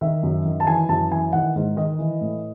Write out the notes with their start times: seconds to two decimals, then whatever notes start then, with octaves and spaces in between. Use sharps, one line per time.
0.01 D#3 E5
0.23 F#2
0.45 D#3
0.60 A5
0.67 E3 G#5
0.89 F#2 A5
1.11 E3 G#5
1.33 D#3 F#5
1.56 G#2
1.76 D#3 D#5
1.99 E3
2.21 A2